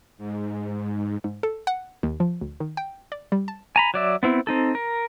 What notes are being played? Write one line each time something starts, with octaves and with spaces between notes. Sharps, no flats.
G#2
G#2
A4
F#5
D#2
F3
D2
D#3
G5
D5
G3
A5
G#5 A#5 B5
F#3 D5 E5
B3 C4 E4
C4 D#4 A4
A#4